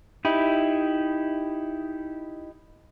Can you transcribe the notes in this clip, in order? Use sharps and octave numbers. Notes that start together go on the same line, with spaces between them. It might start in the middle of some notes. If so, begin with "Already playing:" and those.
D#4 E4 G4